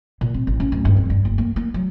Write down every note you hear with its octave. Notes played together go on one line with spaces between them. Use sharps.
A#2
C4
A1
C#4
D1
G2
F2
G2
F#1
A#3
A#3
F#3